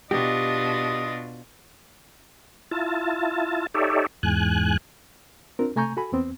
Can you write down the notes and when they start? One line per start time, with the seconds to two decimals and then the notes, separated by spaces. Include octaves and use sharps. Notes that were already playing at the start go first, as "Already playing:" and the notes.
0.11 B2 D4 F4 G4 D#5
2.71 E4 F4 A5
3.74 D#4 G4 A4 C#5 D5 E5
4.23 E2 G#2 G#5 F#6
5.59 C4 D4 F4 A#4
5.76 C3 A3 G#5 A#5 C#6 G6
5.97 F#4 A4 G#5 B5
6.12 E2 B3 C4